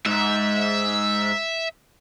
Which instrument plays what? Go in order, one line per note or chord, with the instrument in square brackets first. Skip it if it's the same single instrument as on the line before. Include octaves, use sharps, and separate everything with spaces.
[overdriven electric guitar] G#2 [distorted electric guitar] E5